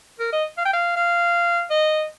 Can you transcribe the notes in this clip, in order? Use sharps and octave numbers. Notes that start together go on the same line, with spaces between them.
A#4
D#5
F5
G5
F5
F5
D#5